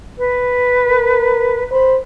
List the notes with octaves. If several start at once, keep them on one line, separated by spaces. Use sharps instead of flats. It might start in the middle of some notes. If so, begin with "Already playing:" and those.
B4
A#4
C5 B5